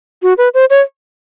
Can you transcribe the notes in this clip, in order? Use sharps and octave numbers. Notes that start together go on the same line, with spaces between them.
F#4
B4
C5
C#5